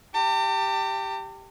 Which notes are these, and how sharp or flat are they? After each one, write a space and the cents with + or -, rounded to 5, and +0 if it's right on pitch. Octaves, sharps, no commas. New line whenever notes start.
G4 +0 A5 +45